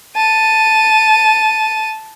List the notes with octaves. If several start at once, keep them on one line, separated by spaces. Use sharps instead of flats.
A5 D#7